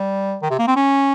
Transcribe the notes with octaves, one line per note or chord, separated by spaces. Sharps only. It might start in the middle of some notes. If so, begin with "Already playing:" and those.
Already playing: G3
D#3
C3
A#3
C4
C#4